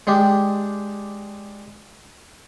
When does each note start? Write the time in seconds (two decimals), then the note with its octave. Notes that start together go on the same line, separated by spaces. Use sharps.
0.07 G#3 D4 G4